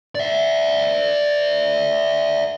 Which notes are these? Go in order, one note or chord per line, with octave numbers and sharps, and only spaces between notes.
D5 E5